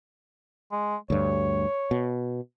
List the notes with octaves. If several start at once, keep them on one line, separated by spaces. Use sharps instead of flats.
G#3
D2 G2 C#5
B2